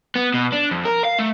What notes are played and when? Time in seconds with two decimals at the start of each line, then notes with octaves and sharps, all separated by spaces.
0.15 B3
0.34 B2
0.52 D4
0.71 F2
0.85 A#4
1.05 F5
1.19 A3